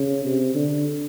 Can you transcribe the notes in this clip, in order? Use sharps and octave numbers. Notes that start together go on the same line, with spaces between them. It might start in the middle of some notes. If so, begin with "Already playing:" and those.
Already playing: C#3
C3
D3